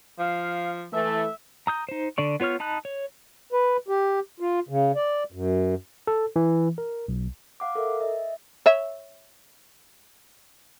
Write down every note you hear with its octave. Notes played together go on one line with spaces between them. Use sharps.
F3 F5
E3 A3 A4 E5
A#5 D#6 G6
D#4 C5
D3 D5 C#6
B3 F4 C#5 C#6 F6
D#4 A5 B5 D#6 F#6
C#5
B4
G4
F4
C#3
D5
F#2
A4
E3
A#4
B1
F5 F#5 D6
A4 A#4 E5
D#5 E5
C#5 E5